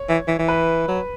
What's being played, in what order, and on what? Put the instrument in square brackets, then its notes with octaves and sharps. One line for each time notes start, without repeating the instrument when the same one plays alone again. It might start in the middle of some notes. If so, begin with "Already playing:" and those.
Already playing: [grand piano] C#5
[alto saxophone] E3
E3
E3
[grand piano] B4
[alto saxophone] F#3